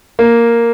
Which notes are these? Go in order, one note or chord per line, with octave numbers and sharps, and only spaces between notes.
A#3